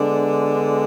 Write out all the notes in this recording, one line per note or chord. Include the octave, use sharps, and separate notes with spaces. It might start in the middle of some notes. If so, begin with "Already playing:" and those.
Already playing: D3 G#3 B3 D4